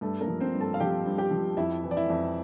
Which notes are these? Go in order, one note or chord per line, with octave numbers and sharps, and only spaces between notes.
G2 A3 A4
A#3 A#4
F3
C4 C5
G2
A4 A5
F5
F3 G4 G5
G2
G4 G5
F3
F2 E4 E5
E3
D5
E4 E5
F2